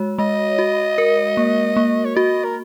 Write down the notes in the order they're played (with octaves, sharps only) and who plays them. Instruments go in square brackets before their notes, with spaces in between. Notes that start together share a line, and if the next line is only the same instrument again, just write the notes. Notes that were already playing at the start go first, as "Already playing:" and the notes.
Already playing: [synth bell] G#3 F#4 C#5
[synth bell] G#3 [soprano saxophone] D#5
[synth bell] F#4
A#4
A#3
A#3
[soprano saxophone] C#5
[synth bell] F#4 [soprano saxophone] D#5
[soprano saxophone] A#4